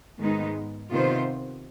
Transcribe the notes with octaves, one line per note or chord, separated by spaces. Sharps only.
G#2 D#3 G#3 B3 D#4
C3 D#3 B3 F4 C5